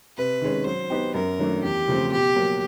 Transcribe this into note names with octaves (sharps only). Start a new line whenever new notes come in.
C3 B4
D#3 G#3 C#4
F#3 C5
B3 D#4 G4
F#2 A#4
D#3 F#3 A3 D4
E2 G4
C#3 F3 A3 C4
B2 G4
F#3 A#3